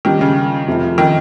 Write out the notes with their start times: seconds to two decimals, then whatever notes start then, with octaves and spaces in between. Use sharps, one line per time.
0.05 A#2 D#3 G3 A#3 C#4 G4
0.21 C#3
0.67 F1 F2 C3 F3
0.98 D#3